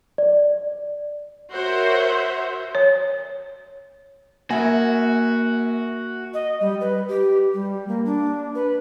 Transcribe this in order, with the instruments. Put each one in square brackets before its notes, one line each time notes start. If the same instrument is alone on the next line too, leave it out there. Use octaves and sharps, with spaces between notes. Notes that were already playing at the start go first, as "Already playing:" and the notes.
[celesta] D5
[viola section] F#4 A#4 C5 C#5 E5
[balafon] C#5
[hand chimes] A#3 [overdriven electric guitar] F#4 [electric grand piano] A#4 E5 G#5
[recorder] D#5
G3
B4
G4
G3
A#3
D4
B4